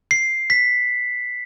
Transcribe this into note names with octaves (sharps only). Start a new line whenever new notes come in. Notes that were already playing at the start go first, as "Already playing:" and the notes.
C7
B6